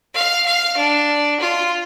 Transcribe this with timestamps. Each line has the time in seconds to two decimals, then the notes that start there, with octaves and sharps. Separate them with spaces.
0.14 F5
0.46 F5
0.77 D4
1.40 F4